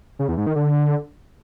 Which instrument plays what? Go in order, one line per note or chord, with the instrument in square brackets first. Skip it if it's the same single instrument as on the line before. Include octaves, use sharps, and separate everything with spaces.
[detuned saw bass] C#3
E2
G#2
D#3
D3